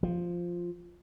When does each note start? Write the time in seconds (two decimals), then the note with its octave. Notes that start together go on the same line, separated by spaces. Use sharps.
0.03 F3